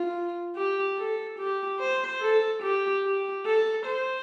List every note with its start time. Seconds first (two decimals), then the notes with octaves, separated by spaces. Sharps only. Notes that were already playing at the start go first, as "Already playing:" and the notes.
Already playing: F4
0.56 G4
0.98 A4
1.39 G4
1.80 C5
2.22 A4
2.63 G4
3.04 G4
3.46 A4
3.87 C5